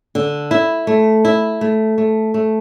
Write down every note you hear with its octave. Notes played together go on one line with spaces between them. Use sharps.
D3
E4
A3
E4
A3
A3
A3